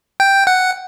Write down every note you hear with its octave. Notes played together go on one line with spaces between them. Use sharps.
G5
F#5